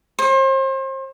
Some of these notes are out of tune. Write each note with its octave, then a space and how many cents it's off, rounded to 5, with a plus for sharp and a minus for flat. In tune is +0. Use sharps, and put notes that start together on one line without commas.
C5 +35